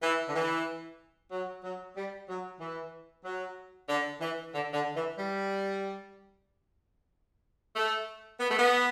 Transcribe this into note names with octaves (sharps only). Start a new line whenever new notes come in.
E3
D3
E3
F#3
F#3
G3
F#3
E3
F#3
D3
E3
D3
D3
E3
G3
A3
B3
A3
B3